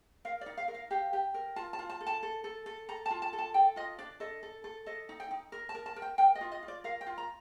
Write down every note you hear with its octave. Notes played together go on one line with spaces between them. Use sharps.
A#4 F5
D5
D#4
F5
A#4
F5
G4 F5
G4
A#4
F4 A5
A5
F4
A5
A4
A5
A4
A4
A4
A4 A#5
A5
F4
A5
A4
A5
A4 G5
F4 D#5
D4 D5
A4 D#5
A4
A4
A4 D#5
D#4
G5
D#4
A#4
A5
A#4
A5
A#4
G5
A#4 G5
D#5
F4
D#5
F4
D5
A#4 F5
G5
F4
A#5